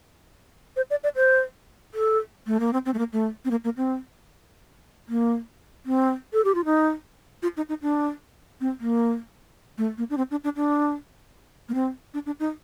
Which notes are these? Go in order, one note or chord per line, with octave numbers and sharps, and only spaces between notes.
C5
D5
D5
C5
A4
A3
A#3
C4
C4
A3
A#3
A3
C4
A#3
A#3
C4
A#3
C4
A4
G4
F4
D#4
F4
D#4
D#4
D4
C4
A#3
A3
A#3
D4
C4
D4
D4
D4
A#3
C4
D4
D4
D#4